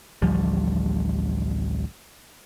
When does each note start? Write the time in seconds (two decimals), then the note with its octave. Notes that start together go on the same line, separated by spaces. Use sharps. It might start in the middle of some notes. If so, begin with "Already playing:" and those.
0.22 A1 D2 F3 G3